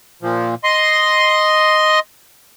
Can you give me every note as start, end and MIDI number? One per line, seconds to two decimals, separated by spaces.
0.22 0.55 46
0.22 0.55 53
0.64 2.00 75
0.64 2.00 84